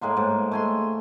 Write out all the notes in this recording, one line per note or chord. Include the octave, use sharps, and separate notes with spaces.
A2 G#3 A#3 C6
G#2
A3 G#5 C6